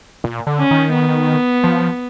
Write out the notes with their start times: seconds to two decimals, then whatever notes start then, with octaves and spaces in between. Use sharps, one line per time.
0.24 A#2
0.47 D3
0.59 C#4
0.71 D#3
0.94 B3
1.64 F3